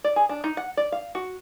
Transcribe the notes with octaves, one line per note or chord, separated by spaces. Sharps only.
D5
G#4
D4
D#4
F#5
D5
F5
F#4